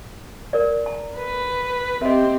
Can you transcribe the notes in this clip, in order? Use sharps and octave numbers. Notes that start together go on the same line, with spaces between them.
A#4 B4 D5
A5 A#5
B4
C4 G4 D#5 E5